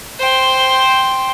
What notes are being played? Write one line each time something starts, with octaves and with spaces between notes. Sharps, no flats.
C5 G5